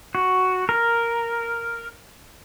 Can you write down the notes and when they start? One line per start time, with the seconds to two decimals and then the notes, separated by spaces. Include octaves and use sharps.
0.15 F#4
0.69 A#4